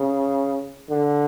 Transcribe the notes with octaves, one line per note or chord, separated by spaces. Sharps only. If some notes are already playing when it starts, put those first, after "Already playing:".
Already playing: C#3
D3